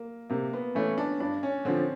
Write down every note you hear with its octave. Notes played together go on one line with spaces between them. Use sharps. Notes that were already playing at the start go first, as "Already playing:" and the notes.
Already playing: A#3
C3 A#3
B3
E3 A3 C#4
D4
G2 D4
C#4
D3 F3 C4